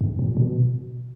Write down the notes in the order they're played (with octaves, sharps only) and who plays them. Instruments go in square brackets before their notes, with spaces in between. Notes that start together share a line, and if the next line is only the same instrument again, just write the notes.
[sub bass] G2
A#2
B2